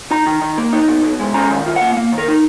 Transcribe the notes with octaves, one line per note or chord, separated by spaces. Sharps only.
D#4 A#5
D#3
D#3
A#3
D#4
B2
B2
G#3
C#4 A#5
D#3
F4
F#5
A#3
A#3
D#3
A#4
D#4